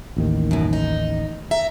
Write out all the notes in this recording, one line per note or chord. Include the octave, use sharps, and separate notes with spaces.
A1 D#2 D#3
F#2 B2
D#4
E5 A#5